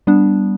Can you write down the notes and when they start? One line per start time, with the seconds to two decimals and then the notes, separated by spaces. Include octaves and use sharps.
0.07 G3 B3 D4